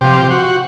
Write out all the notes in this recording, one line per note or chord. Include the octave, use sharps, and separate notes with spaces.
C3 F3 G4
F#4